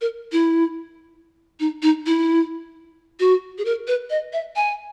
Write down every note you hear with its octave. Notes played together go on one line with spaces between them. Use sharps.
A#4
E4
D#4
D#4
E4
F#4
G#4
A#4
B4
D#5
E5
G#5